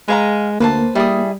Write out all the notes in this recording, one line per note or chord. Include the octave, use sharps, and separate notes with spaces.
G#3 B4 F5 A#5
D2 A#3 B4 C5 A5
G3 E4 G#4 D#6